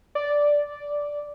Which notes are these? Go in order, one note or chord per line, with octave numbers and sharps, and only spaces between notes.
D5